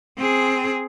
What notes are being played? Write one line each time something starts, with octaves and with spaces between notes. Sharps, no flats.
C4 G#4